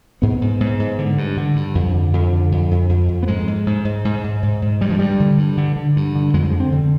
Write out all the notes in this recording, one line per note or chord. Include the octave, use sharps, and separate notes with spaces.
G#2 B3
G#2
G#2
G#2
D3
G2
D3
G2
F2
D3
F2
D3
F2
F2
F2
F2
B3
G#2 G#3
G#2
G#2
G#2
G#2
G#2
G#2
G#2
G2 G3
F3
G2 G3
D3
G2
D3
D3
G2
D3
F2 G#3
G3
G#3
D3
C4
D3